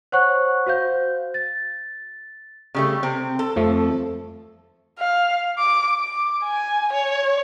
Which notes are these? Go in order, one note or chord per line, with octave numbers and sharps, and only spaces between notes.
C5 C#5 F#5 C#6 F#6
F#4 C5 F5 G6
A6
C#3 G3 A3
C3 C4
A4
F2 F3 A3
F5
D6
D6
G#5
C#5